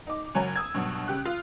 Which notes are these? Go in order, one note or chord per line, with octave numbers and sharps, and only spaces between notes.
D#4 D6
F#1 F#3 C#5 G#5 A#5
D#6 E6 G#6
G2 B2 F#3
C#3 G4 F#6
F4